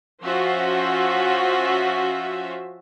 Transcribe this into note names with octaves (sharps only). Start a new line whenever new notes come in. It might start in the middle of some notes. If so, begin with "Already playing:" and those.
F3 C#4 F4 F#4 C5 E5